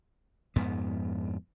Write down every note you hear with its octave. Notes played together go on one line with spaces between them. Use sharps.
F2 G#2 B3